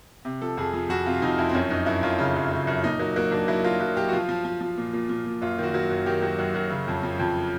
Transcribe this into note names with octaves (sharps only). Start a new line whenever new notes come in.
C3
F3 A4
F2 G#4
F3
F2 F#4
C3 F4
F2 D#4
F2 E4
C4
F#2 C#4
F#2 D#4
F#2 E4
F#2 F4
C#3
F#2
C#3
F#2
A#2 D#4
F#3 A#3
F#3 A#3
F#3 D4
F#3 E4
F#3 F4
F#3 F4
F#3 G4
F#4
F3 F4
F3
F3
F3
A#2
A#2
A#2
A#2
F#2 F4
D#3 F#4
F#3
F#2
D#3 G4
F#3
F#2
F#2
C#3
F2
F3
F2